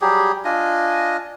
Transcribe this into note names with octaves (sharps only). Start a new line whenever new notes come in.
F#3 G3 G4 G#4
D4 F4 D#5 G#5